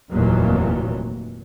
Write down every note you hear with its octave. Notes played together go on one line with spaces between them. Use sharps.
F1 D#2 A#2 E3 F#3